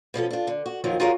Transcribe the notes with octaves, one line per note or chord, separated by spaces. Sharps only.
B2 F3 C#4 A4
D4 F4
D3
F#4
F2 D#3 F3 F#3 A#3 F4
F4 F#4 G#4 A#4 C#5 F5